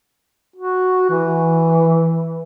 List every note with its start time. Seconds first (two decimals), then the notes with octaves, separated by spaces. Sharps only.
0.56 F#4
1.10 E3